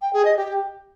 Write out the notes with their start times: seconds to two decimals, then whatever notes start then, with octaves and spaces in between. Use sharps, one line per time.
0.01 G5
0.13 G#4
0.25 D#5
0.36 G4